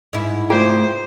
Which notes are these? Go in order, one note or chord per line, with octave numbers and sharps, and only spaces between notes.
G#2 E4
A3 F4 G#4 C5 D5 F5 G5